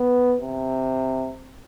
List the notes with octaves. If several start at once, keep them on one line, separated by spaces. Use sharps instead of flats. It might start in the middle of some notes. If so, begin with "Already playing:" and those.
Already playing: B3
C3